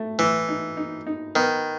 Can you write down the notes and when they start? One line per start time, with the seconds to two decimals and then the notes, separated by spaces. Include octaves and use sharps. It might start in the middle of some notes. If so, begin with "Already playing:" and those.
Already playing: A3
0.19 A2 E3
0.49 D#4
0.77 D#4
1.07 D#4
1.35 D#3 B3